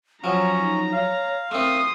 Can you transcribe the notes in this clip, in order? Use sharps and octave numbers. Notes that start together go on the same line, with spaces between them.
F3 F#3 C#4 F#5 A#5
D#4
C#5 F5
A3 C4 A#4 C6 D#6